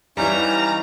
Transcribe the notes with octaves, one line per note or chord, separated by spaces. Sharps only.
E3 G3 C#4 D#4 F5 A#5